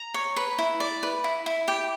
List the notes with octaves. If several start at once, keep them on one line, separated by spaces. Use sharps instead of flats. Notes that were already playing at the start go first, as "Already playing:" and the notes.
Already playing: A#5
C#5
B4
E4
D5
B4
E4
E4
G4 G5